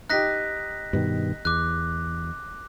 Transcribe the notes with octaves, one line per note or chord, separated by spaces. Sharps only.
D#4 G4 F#6 A#6 B6
G2 B2 D#3
E2 D6 F#6